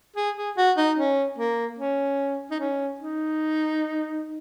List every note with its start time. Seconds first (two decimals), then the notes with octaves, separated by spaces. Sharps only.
0.16 G#4
0.37 G#4
0.57 F#4
0.77 D#4
0.98 C#4
1.38 A#3
1.79 C#4
2.51 D#4
2.60 C#4
3.00 D#4